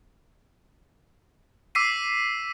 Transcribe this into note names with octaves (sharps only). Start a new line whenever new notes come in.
D6 E6 B6 C7 D#7